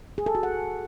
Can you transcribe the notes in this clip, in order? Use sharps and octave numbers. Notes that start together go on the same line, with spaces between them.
G#4
A4
F#4
F#5